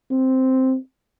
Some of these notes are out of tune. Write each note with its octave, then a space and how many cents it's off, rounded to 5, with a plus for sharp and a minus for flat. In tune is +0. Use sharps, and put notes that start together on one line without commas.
C4 +0